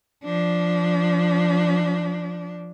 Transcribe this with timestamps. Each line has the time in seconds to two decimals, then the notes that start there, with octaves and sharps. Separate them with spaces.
0.25 F3 D4